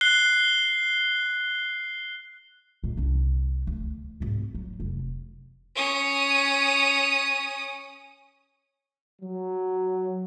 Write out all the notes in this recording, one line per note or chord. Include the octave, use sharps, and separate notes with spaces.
F#6 C7 G7
A#2 G#3
C2 D4
D2
G#1 A2
F#3
F1
C#4 D#6
F#3